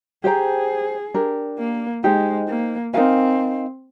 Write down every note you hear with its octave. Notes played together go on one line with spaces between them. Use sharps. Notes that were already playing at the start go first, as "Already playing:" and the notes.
G4 G#4 C5 G5 A#5
D4 G4 A#4
A#3
G#3 D#4 G4 C5 G5
A#3
C4 D#4 A#4 F5 G#5